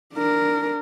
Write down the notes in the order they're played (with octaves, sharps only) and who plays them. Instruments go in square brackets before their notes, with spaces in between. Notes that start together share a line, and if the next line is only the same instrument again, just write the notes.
[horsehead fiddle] D4 A#4